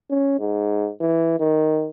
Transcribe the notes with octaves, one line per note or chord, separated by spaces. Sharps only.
C#4
G#2
E3
D#3